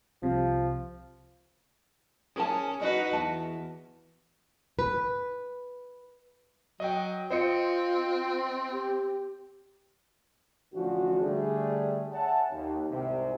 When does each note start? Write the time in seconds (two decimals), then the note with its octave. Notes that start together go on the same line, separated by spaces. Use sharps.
0.22 C2 C3 F3
2.36 C#4 G#4 A#4 A5
2.81 D#4 F#4 B4 D#5
3.13 E2 A5
4.79 B4
6.80 F#3 D#5 G5
7.30 C4 F4 C5 D#5 C#7
8.72 G4
10.74 A1 D3 F3 C#4 D4 F#4
11.22 D3 G3 A3 D4 G#4
12.13 C#5 E5 F#5 G#5 A5
12.52 D#2
12.91 C2 G#2 C3